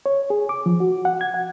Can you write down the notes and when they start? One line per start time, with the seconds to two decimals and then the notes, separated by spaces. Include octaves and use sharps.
0.06 C#5
0.30 G#4
0.49 D6
0.66 F3
0.80 F#4
1.05 F#5
1.21 G#6
1.34 F#5